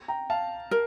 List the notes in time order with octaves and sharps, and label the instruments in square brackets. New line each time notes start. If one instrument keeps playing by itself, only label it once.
[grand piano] G5 A#5
F5 A5
[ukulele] A#4